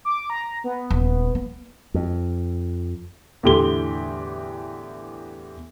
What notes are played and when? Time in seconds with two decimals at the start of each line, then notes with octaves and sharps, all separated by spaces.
0.05 D6
0.30 A#5
0.64 B3
0.91 D#1
1.35 A#3
1.94 F2
3.43 E2 A2 D3 G4 C6 G7